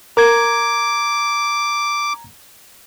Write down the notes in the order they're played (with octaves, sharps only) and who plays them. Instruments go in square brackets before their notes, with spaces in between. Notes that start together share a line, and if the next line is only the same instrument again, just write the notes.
[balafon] A#4 [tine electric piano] A#5 G#6 [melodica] D6